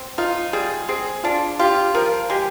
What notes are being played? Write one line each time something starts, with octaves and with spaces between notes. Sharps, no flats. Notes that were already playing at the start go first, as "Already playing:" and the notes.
Already playing: C4
D#4 F4
G3 G#4
C4 G#4
D4 F4
F4 G4
F3 A#4
G#3 G4